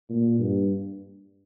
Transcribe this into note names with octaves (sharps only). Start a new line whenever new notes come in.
A#2
G2